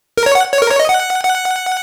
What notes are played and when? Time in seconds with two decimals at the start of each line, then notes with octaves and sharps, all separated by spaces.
0.17 A#4
0.26 C#5
0.35 F#5
0.53 C#5
0.62 A#4
0.71 C#5
0.80 D#5
0.89 F#5
1.24 F#5